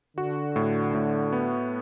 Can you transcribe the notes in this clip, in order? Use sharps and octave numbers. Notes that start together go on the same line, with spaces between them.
D3 F#4
A2
A2
B3